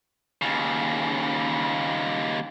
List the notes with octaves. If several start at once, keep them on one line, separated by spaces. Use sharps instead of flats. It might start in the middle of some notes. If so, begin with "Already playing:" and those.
D#2 C#3